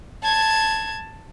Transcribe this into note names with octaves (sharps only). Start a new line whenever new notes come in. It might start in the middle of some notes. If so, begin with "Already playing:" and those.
A5 G#6